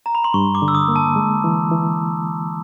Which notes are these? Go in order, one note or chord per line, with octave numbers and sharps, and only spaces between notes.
A#5
B5
C6
G2 C#6
D6
D3
E6
D#6
A#3
A5
G#3
E3
E3